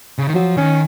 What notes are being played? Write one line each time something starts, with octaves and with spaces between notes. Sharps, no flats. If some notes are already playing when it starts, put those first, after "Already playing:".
C#3
D#3
F3 F#3
D#3 C#4